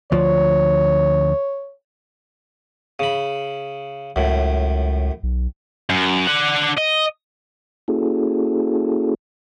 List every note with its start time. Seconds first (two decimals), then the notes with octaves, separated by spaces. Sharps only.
0.12 D2 F3 C#5
2.99 C#3 B5
4.16 C#2 F#2 A2
5.23 B1
5.90 F#2
6.27 D4 F#5
6.78 D#5
7.88 A#3 C#4 E4 F#4 G#4 A4